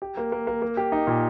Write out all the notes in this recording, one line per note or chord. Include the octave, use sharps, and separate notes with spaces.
G4
A#3
A#3
A#3
A#3
G4
D#4
A#2